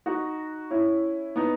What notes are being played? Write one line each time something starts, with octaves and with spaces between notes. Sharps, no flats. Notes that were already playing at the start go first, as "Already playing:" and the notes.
D#4 F#4
C#4 E4
B3 D#4